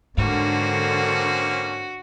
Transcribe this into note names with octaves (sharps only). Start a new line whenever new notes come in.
G#2 D3 A#3 C4 C#4 F#4